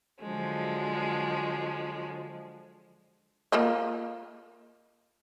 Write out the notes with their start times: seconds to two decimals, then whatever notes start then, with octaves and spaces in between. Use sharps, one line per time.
0.21 D3 F3 F#3 G#3
3.52 A#3 F4 D#5